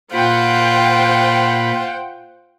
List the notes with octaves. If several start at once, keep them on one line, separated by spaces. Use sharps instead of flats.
A#2 F4 C5 F#5 G5 B5